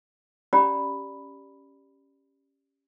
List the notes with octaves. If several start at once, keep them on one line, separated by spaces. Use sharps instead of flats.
C#4 G4 D5 A#5 B5